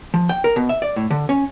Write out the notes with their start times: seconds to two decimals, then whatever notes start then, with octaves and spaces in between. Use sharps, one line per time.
0.14 F3
0.29 G5
0.44 A#4
0.56 B2
0.69 E5
0.82 D5
0.96 A2
1.11 D3
1.29 C#4